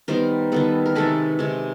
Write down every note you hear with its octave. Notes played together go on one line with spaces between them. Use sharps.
D#3 G3 B3 A#4 C5
D#3 G3 B3 A4 B4
A#4
C3 D#3 G#3 A4 B4
C3 D#3 G#3